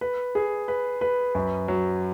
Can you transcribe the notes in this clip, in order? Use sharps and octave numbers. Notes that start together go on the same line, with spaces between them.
B4
G#4
B4
B4
F#2
F#3